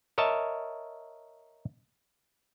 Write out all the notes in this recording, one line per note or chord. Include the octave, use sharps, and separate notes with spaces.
A#4 C#5 D#5 E5 A5